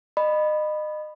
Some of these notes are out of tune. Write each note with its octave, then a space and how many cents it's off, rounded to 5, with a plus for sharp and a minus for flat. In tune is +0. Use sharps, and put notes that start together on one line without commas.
D#5 -30 B5 +0